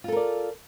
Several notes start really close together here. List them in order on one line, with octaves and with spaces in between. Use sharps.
F4 A4 A#4 D5